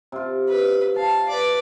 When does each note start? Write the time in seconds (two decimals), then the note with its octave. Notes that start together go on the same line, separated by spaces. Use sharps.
0.12 C3 F4
0.49 B4
0.96 F5 A5
1.29 B4 D5